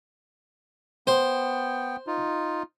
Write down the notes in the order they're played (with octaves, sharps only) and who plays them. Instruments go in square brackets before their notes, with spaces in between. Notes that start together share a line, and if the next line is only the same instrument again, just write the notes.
[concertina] B3 G5 [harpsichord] C5
[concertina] D#4 F4